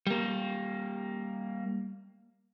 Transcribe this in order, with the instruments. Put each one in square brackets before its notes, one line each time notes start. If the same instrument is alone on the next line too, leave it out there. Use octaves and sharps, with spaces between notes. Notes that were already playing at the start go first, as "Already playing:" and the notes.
[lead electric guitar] G3 A#3